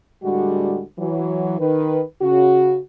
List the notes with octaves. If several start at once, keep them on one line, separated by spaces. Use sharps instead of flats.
A2 D3 G3 G#3 F#4
E3 F#3
D#3 B4
C#3 F#4